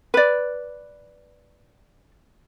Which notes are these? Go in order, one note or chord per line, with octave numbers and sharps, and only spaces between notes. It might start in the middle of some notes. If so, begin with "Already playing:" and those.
B4 D5